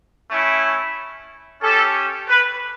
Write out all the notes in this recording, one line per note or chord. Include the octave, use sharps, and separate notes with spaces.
A3 C#4 E4
C#4 G4 A4
B4